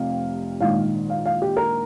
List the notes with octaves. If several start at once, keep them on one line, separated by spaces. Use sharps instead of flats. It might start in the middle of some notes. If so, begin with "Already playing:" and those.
Already playing: F1 F2 C3 F5
A#1 G#2 D#3 F5
F5
F5
G4
A#4